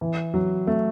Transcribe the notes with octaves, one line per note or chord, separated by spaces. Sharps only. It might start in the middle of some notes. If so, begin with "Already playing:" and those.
E3
F#3
A3